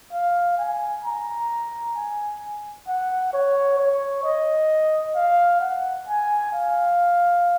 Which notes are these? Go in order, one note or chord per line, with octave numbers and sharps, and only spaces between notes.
F5
G#5
A#5
G#5
F#5
C#5
C#5
D#5
F5
F#5
G#5
F5